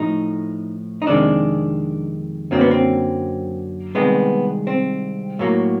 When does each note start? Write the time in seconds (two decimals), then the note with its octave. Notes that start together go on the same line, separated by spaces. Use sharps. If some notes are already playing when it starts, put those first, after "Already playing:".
Already playing: A2 F3 A3 D#4
1.02 D#4
1.07 F2 C3 D#3 G#3 D4
2.51 F#2 D3 F#3 A#3 C4
2.61 B3
2.71 C4
3.95 C2 C3 D#3 G#3 B3
4.67 C4
5.39 A2 F#3 A#3